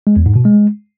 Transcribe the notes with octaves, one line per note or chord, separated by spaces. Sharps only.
G#3
E2
G#2
B2
G#3